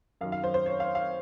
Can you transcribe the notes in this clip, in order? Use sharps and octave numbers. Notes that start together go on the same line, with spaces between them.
F#2 D#3 F#3 F5
F5
C5
C5
C#5
F5
F5